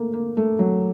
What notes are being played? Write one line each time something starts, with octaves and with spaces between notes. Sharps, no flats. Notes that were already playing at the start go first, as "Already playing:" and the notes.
Already playing: A3 A#3
A#3
A3
F#3